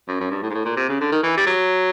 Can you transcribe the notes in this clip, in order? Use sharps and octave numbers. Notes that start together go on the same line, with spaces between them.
F#2
F#2
G2
A2
G#2
A2
A#2
C3
C#3
D3
D#3
E3
G3
F#3